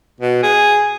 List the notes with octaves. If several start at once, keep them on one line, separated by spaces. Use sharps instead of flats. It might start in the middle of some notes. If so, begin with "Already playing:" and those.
B2
G#4